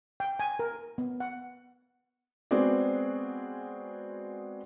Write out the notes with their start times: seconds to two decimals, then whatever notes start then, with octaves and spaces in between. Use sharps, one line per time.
0.20 G5
0.39 G#5
0.59 A#4
0.98 B3
1.20 F#5
2.51 G#3 B3 C4 F#4 G#4 D5